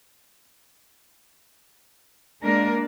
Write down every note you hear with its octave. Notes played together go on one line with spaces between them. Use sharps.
G#3 A#3 D4 A#4 D5